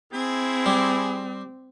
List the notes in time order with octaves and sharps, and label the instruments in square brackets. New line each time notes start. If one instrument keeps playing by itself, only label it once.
[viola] C4 [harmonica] E4 G#4
[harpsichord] G3